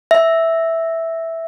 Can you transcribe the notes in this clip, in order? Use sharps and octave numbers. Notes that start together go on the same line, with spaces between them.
E5